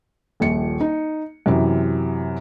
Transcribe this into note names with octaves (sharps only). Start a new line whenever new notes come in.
D#1 A#1 C#7
D#4
F#2 C3 E3